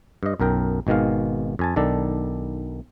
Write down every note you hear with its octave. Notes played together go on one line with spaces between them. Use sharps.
G2 D#5
B1 F#2 A#4 G5
G#1 B2 D#3 G#3 F5
F2 G#5 A5
B1 D#3 D4 A4 D5